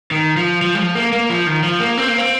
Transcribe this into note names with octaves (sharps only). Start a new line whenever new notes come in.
D#3
F3
F3
G3
F3
A#3
A#3
F3
D#3
F3
A#3
C4
A#3
C4